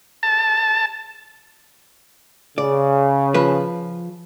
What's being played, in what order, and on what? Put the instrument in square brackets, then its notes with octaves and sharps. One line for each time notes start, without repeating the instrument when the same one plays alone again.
[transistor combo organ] A5
[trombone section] C#3 [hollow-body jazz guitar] D5
[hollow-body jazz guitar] F3 B4